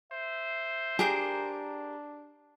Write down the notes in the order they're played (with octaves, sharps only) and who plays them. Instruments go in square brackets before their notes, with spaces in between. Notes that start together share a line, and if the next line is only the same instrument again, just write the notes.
[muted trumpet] C5 [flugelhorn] E5
[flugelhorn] D4 [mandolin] G4 A#4 G6 [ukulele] G#4